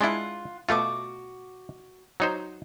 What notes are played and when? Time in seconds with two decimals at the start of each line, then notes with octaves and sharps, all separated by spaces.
0.01 G#3 D4 E4 F4 F#5
0.69 B2 A3 F4 F#4 D6
2.20 F#3 D#4 C5